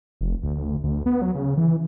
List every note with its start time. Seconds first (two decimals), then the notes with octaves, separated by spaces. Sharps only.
0.21 F1
0.43 D2
0.84 D2
1.06 B3
1.22 F#3
1.35 C#3
1.57 E3